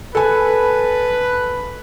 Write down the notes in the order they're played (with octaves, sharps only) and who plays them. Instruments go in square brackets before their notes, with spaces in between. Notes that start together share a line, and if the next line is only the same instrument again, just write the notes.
[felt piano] A4 G#5 [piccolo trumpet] B4